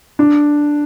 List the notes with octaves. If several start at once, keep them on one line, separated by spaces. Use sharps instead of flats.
D4